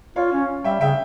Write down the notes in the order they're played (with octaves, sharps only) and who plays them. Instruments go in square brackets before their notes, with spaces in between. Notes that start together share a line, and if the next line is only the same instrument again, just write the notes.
[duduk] F4 [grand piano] C#5 F5
[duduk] C#4
[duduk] G3 [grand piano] E5 G5
[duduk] C#3 [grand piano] E5 G5